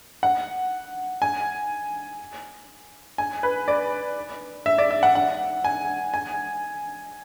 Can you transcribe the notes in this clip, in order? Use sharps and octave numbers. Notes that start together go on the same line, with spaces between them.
F#5
G#5
G#5
B4
D5
E5
D5
E5
F#5
F#5
G#5
G#5